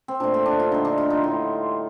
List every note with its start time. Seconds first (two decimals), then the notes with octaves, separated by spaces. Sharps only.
0.08 C4
0.20 A#2 A3 D4
0.34 C4
0.46 D4
0.60 F4
0.72 D3 G3 D#4
0.85 D4
0.98 F4
1.10 D#4
1.24 A2 G3